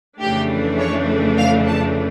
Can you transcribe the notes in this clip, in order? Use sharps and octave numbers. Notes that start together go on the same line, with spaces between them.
F2 C#3 E3 A3 D4 G4
C#5
F5
A5